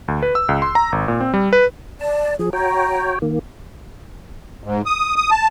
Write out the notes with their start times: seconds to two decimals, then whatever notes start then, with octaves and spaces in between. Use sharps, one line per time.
0.08 D2
0.22 B4
0.35 E6
0.49 C#2
0.62 C6
0.75 A#5
0.92 G#1
1.08 A#2
1.21 C4
1.34 G3
1.53 B4
2.01 D5 A5
2.39 F3 G#4
2.53 F#4 C#5 G5 A#5
3.22 D#3 A#3
4.64 G#2
4.86 D#6
5.16 D#6
5.31 A5